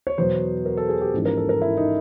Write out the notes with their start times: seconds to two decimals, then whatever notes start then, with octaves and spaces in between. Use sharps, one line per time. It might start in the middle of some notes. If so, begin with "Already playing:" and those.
0.07 C#5
0.18 E2 B2 F#3 B3 C5
0.66 A#4
0.77 A4
0.89 G#4
1.01 G4
1.14 A1 G#2 F3 A#3 C#4
1.25 A#4
1.37 A4
1.49 A#4
1.62 E4
1.77 D#4